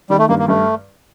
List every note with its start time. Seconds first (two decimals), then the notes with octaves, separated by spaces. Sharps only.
0.10 D#3 G3
0.19 A3
0.29 G2 A#3
0.39 A#3
0.48 G2 A3